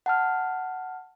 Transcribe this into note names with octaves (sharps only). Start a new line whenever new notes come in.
F#5 A5 F6